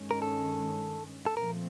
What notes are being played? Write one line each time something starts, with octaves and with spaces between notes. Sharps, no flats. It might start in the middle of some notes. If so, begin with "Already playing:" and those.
Already playing: G2 D#3 G#3 C#4
A#4
A4
A4
A#2 F3 A3 C4 A#4